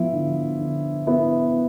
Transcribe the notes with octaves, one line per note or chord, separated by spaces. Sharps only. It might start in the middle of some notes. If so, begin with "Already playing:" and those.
Already playing: F3 B3 E4
D3
D3
B3 E4